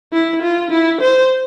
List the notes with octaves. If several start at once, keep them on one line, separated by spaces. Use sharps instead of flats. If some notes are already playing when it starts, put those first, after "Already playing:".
E4
F4
E4
C5